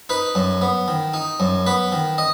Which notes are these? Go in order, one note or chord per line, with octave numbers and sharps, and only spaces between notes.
D#4 B4
F#2
B3
D#3
D#4
F#2
B3 B4
D#3
D#5